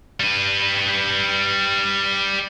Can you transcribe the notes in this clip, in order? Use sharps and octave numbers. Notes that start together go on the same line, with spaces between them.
G3 B4